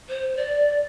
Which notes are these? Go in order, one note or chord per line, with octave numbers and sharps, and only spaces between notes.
C5
D5